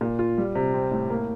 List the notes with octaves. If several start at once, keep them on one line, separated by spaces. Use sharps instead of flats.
A#2
F4
G3
C3
C4
A2
A#3